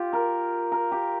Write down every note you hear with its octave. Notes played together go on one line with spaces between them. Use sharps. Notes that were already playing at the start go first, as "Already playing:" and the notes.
Already playing: F4 G4
A#4
A#4
G4